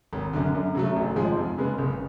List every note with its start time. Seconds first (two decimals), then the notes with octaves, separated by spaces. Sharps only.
0.13 G#1
0.33 F#2 D3
0.54 F#2
0.75 C#3 F#3 A3
0.96 A1
1.16 G#2 F3 G#3
1.37 F2
1.58 C#3 G#3 B3
1.78 F#1